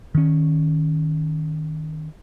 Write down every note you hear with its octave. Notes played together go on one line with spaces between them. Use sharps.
D#3 C#4